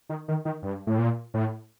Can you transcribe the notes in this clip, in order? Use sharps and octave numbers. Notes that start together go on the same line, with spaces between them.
D#3
D#3
D#3
G2
A2
A#2
A2